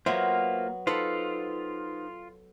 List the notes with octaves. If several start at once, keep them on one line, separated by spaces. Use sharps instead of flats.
F#3 A#3 B3 F4 C5 E5
D#4 F4 A4 B4 C5 B5